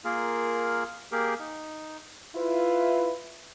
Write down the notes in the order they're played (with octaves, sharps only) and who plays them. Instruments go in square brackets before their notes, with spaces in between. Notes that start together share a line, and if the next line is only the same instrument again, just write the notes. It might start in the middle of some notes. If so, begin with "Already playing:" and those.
[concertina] A#3 F4 G#4 A#4
A#3 G4 G#4 A#4
D#4
[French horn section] E4 F4 B4